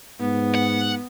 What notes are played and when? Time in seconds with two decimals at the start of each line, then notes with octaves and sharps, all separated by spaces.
0.20 G#2 B3
0.55 F#5